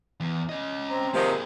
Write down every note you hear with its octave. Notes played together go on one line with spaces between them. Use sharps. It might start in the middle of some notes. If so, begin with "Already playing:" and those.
E2
C#4 D#5
C4 A#5
C3 D#3 F3 A#3 G#4